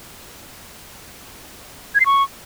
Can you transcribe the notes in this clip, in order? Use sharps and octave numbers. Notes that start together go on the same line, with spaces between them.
G#6
C7
C#6